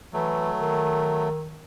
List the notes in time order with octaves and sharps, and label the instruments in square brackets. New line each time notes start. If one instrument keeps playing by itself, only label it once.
[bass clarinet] E3 [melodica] F#3 A3
[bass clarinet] D#3